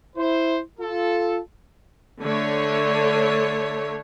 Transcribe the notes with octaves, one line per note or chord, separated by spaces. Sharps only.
E4 C5
F4 A4
D3 A3 C#5